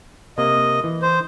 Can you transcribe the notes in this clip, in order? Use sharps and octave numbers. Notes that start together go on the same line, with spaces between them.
C3 A#3 D#5 F5
E3
C5